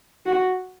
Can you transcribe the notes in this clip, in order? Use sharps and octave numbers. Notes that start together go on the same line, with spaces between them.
F#4